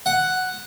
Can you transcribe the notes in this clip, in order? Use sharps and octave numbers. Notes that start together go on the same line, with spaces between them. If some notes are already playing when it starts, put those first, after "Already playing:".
F#5